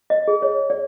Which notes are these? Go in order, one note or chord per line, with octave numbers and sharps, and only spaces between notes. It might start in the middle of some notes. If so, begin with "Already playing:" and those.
D#5
G#4
C#5
D5